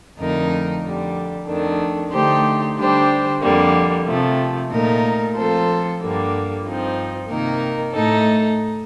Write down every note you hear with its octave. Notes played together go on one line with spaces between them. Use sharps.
F2 D3 A3 D#4 A#4
F2 D3 G3
F2 D#3 A3 D4
D3 A3 D#4 G4 C5
D3 G3 D4 G4 C5
F2 D3 G3 A#3
C3 F3 A3
A#2 A3 D#4 A#4
F3 C4 F4 A4 C5
G2 D3 G3 A#3
G2 F3 C4 D#4
C3 D#3 A#3 D#4 A#4
A2 A3 D#4 A4